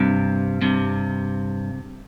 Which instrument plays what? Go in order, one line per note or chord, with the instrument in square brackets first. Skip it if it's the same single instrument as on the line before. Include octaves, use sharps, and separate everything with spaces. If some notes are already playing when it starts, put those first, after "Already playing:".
Already playing: [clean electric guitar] G2 C3
G2 C3